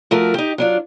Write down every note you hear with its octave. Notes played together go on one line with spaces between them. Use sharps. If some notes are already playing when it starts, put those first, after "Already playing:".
F3 A3 F#4 A#4
D#4 G4
F#3 D4 F4